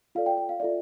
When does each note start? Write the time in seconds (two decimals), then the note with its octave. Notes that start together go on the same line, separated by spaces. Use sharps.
0.15 F4 A4 D5 F5
0.26 G5
0.37 G5
0.49 F5
0.60 F4 A4 D5 E5